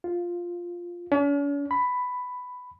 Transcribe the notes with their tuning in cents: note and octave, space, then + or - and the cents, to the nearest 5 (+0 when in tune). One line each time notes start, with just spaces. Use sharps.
F4 +0
C#4 +45
B5 +10